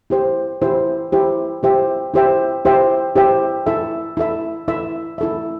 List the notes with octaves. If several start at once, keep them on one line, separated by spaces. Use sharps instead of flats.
E4 G4 C5
E4 G4 C5
E4 G4 C5
E4 G4 C5 E5 G5
E4 G4 C5 E5 G5
E4 G4 C5 E5 G5
E4 G4 C5 E5 G5
E4 A4 E5
E4 A4 E5
E4 A4 E5
E4 A4 E5